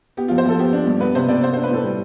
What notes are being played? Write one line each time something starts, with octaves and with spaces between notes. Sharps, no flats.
B3 G4
F2 F4
C5
F2 A4
B3 G4
D4
G2
B3 B4
C3 C5
C3 D5
B3 C5
D4 C5
B4
A2 A4
G3